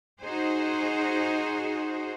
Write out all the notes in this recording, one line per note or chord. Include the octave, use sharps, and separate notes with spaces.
D#4 F#4 G#4 C5